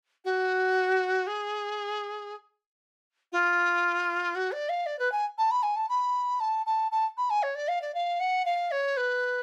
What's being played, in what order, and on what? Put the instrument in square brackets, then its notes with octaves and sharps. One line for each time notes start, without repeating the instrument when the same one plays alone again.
[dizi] F#4
G#4
F4
F#4
D5
F5
D5
B4
G#5
A5
B5
G#5
A5
B5
A5
A5
A5
B5
G#5
C#5
D5
F5
D5
F5
F#5
F5
C#5
B4